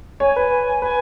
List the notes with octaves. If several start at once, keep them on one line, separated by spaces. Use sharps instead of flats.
C#5 G#5
B4
B4 G#5